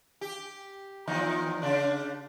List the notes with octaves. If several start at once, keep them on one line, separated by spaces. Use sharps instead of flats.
G4
D#2 F3 D#4
C#3 D4